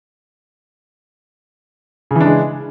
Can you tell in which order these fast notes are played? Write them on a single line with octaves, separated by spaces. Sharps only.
C#3 E3 D4 G#3